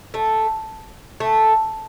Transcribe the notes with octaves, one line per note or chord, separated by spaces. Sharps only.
A3
A3